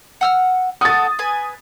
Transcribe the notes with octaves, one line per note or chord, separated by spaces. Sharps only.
F#5 E6 F6
F#4 A4 D#6 A6
B4 G#5